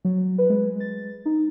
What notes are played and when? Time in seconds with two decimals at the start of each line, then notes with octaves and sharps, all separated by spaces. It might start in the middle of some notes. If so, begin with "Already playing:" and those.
0.05 F#3
0.38 B4
0.50 G#3
0.80 A6
1.26 D#4